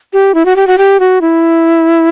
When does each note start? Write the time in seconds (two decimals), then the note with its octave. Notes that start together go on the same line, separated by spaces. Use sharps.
0.13 G4
0.35 E4
0.45 F#4
0.56 G4
0.67 F#4
0.78 G4
1.00 F#4
1.21 E4